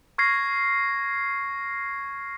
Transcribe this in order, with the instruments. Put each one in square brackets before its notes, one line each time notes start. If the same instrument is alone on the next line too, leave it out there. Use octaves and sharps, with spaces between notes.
[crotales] C#6 F6 G#6 A#6 C7